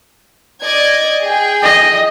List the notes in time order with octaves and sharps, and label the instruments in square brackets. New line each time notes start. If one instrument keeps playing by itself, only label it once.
[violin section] D5 D#5 G#6
G#4 G5
[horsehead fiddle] D#5